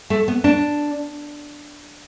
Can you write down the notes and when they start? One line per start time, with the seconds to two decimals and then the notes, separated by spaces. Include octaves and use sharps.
0.10 A3
0.28 B3
0.44 D4